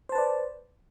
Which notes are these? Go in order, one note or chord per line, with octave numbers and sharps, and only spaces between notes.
B4 C5 D5 A5